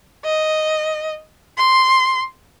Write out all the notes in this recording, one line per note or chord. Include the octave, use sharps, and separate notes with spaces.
D#5
C6